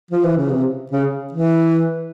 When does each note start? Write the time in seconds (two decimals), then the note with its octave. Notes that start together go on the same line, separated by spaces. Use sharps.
0.11 F3
0.25 E3
0.37 C#3
0.50 C3
0.91 C#3
1.33 E3